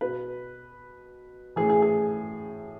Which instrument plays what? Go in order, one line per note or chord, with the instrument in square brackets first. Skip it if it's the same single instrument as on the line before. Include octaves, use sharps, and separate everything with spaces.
[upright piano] B2 B4
A2 E3 G#4
G#4
G#4